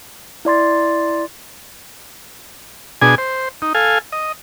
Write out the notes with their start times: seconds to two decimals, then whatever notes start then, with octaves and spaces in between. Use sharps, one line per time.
0.45 E4 D5 C6 A6
3.02 B2 D4 G#4 G#5
3.18 C5
3.62 D#4
3.75 A4 F5 G#5
4.12 D#5